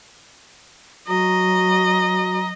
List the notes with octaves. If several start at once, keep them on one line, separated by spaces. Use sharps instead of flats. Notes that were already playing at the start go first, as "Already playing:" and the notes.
F#3 F#4 D#5 A#5